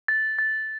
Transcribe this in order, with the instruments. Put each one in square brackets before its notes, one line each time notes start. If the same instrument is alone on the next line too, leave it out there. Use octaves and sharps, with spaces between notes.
[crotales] A6
A6